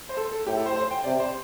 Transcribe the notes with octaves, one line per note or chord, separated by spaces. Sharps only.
C5
A4
A4
A2 G4
A4
C5
C5
G5
C3 D5
C5